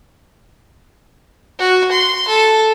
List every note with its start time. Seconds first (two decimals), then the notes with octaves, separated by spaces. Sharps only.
1.59 F#4
1.91 C6
2.28 A4